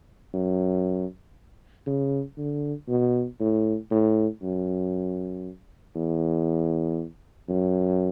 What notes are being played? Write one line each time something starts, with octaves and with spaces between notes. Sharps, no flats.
F#2
C#3
D3
B2
A2
A2
F#2
E2
F#2